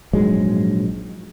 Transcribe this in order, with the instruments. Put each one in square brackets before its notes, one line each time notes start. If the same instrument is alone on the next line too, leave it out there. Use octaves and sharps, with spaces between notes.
[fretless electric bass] A#1 G#2 F#3 G#3